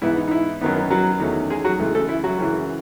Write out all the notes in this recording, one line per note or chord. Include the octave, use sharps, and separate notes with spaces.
G#2 E3 B3 E4
D#4
D#4
E4
F#2 D#3 F#3 B3 D#4
F#3 F#4
E2 D#3 A3 C#4
G#3 G#4
F#3 F#4
C#2 C#3 E3 A3
A3 A4
E4
F#3 F#4
F#2 C#3 E3